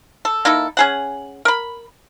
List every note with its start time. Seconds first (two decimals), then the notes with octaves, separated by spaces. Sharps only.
0.25 A4
0.45 A#3 D#4 E4 A4
0.77 C#4 G#4 F#5
1.45 A#4 B5